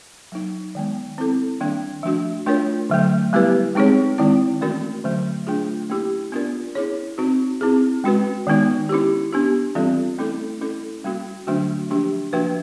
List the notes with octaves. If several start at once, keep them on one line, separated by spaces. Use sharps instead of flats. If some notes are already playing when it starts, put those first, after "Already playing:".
F#3 A#3 D#4
D#3 G#3 B3
C4 E4 A4
D#3 G3 A#3 D4
F3 A3 D4 F#4
A3 D4 F4 A#4 C#5
D3 F#3 A3
G3 B3 E4 G4 B4
G#3 C4 D#4 G#4 C#5
D#3 G#3 C4 E4
E3 A3 C#4 F#4 A#4
D3 F#3 A3
A3 D4 F4 G#4
A#3 C#4 E4 G4
B3 D4 F4 A#4 D5
C#4 E4 G#4 C#5
C4 D#4 F#4
C4 E4 G#4
G#3 C#4 F#4 B4
D#3 G#3 B3 D#4
C#4 E4 G4
B3 D4 G4
E3 G3 C4 F4 A4
A3 C#4 E4 A4
C#4 E4 A4
G3 A#3 C#4 F#4
D3 F#3 A3 D4 F#4
F3 A#3 D4 G4
F3 A#3 D4 F#4 B4